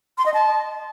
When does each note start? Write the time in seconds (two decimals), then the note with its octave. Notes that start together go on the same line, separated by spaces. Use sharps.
0.18 C6
0.26 D#5
0.34 A5